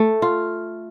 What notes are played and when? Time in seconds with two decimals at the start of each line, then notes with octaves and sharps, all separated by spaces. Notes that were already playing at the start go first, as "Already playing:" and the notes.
Already playing: A3
0.22 F4